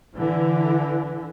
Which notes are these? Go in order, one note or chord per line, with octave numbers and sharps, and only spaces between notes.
D3 E3